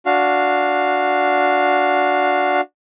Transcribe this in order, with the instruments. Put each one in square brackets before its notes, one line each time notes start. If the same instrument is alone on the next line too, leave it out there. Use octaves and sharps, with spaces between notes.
[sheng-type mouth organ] D4 F#4 F5